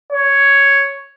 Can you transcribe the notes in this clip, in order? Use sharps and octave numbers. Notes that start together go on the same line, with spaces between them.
C#5